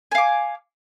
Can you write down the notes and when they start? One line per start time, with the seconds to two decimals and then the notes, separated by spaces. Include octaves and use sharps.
0.12 G#5
0.15 F5
0.18 D6